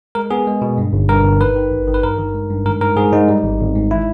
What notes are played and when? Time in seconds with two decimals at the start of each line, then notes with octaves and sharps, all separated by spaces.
0.15 G#3 A#4
0.31 B3 G#4
0.47 G#3
0.62 B2
0.78 G2
0.93 G1
1.09 G2 A#4
1.24 G1
1.40 D#3 B4
1.56 D#3
1.72 G#1
1.87 D#3
1.94 B4
2.03 G2 A#4
2.18 D#3
2.34 G#3
2.50 G2
2.66 G#2 A#4
2.81 G#2 A#4
2.97 G#2 G#4
3.13 G#2 D#4
3.28 G3
3.44 G#1
3.60 G#1
3.75 G#2
3.91 E4